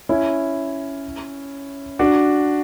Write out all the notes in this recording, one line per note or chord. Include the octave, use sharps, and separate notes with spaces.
C#4 E4
D4 F#4